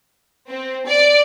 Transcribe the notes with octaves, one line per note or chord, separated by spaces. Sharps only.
C4
D5